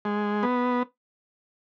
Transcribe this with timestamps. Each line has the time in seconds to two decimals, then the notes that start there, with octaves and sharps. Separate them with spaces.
0.05 G#3
0.43 B3